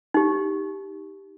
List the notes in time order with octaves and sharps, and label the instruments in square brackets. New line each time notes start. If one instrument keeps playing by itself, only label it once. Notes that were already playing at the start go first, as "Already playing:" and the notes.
[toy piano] D#4 G4